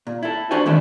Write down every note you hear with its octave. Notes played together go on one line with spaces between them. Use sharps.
A#2
E4 A4
D4 F#4 G4 C5 G#5
D#3 E3 A3 C#4 D4 E4